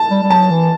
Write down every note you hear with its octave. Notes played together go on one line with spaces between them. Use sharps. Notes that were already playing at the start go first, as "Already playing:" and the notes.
Already playing: A5
G3
G3
F#3 A5
E3